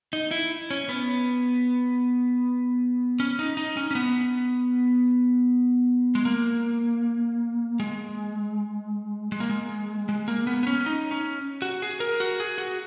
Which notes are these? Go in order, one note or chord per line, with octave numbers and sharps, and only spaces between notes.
D#4
E4
C#4
B3
C#4
D#4
D#4
C#4
C#4
B3
G#3
A#3
G#3
G#3
A#3
G#3
G#3
A#3
B3
B3
C#4
D#4
C#4
F#4
G#4
A#4
F#4
G#4
F#4